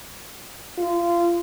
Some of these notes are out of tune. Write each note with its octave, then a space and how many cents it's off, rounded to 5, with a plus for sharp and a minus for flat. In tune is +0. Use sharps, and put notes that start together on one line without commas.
F4 -25